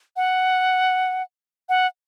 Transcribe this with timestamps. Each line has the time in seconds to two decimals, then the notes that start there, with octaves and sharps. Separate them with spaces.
0.16 F#5
1.69 F#5